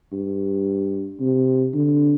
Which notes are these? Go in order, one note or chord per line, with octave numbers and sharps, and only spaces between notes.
G2
C3
D3